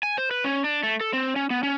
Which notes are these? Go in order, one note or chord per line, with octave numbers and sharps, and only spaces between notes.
G#5
C5
B4
C#4
D4
A3
A4
C4
C#4
B3
C#4